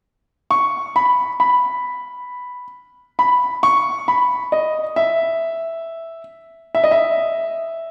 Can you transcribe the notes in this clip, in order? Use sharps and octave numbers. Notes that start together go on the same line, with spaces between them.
C#6
B5
B5
B5
C#6
B5
D#5
E5
E5
D#5
E5